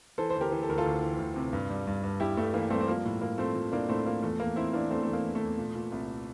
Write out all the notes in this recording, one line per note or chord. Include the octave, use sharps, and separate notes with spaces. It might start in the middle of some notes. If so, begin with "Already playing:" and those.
E3 A4 C5
C5
D2
G4 A#4
E3
A4
D2 A#4
F4 A4
D2
E3
D2
C3
G2
G3
G2
G2
G2 E4 G4
G2 A3
E3 A#3
G3 A3 C4
C4
F3 A#3
A2
F3 A#3
F3 A3 C4
F3
A2 A#3 D4
A2 A3 C4
F3 A#3
E2 A3
E2 A#3
E2 C4 E4
E3 A#3 D4
E2 A3 C4
E2 A3
A#3
E2
A3
E2
A#2
A#2
C2